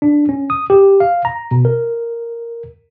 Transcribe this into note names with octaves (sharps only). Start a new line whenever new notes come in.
D4
C#4
D#6
G4
F5
A#5
B2
A#4